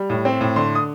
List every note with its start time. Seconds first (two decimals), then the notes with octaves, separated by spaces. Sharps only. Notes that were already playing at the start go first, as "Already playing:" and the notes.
Already playing: G3
0.10 A2
0.25 C4
0.41 A2
0.56 D3 C6
0.75 D#6